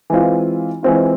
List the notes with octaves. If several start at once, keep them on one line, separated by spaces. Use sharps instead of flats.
E3 G#3 C4 F4
E3 G#3 C4 F4